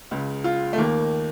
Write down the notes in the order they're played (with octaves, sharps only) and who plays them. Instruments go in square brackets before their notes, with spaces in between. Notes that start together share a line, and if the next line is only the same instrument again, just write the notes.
[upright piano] C#2 C#3
F4
A3
D#2 D#3 A#3